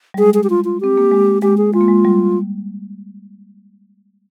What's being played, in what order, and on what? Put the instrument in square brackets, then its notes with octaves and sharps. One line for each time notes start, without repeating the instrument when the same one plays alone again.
[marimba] G3
[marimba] G#3 [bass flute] G#4
[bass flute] G#4
G4
F4
F4
[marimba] C4 [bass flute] G4
[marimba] A#3
G#3
[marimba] G#3 [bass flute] G4
[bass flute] G#4
[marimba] G#3 [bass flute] F4
[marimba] A#3
G#3
G3